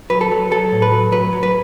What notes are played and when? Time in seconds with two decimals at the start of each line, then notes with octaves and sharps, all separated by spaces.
0.10 F#3 B4
0.21 A4
0.31 F#3
0.51 F#3 A4
0.72 A2
0.82 B4
0.92 F#3
1.12 F#3 B4
1.33 F#3
1.43 B4